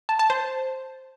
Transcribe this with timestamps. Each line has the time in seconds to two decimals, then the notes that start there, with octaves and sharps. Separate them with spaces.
0.09 A5
0.19 A5
0.30 C5